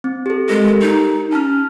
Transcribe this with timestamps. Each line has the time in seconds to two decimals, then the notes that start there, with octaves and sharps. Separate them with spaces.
0.04 C4
0.26 G4 A4
0.49 G#3 G4 A#4
0.82 D#4
1.32 C#4 A5 F6